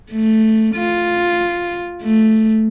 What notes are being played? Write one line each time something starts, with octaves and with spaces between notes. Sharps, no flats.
A3
F4
A3